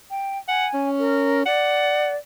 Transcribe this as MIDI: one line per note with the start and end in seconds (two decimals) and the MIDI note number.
0.11 0.38 79
0.48 0.67 78
0.48 0.89 80
0.74 1.43 61
0.99 1.45 70
1.46 2.16 74
1.46 2.12 78